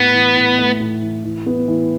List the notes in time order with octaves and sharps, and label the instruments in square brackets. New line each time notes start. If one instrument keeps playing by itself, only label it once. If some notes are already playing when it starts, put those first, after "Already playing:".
Already playing: [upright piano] A2 [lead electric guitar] B3
[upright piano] E3
A2
A3
A2
E3
E3
B3
E3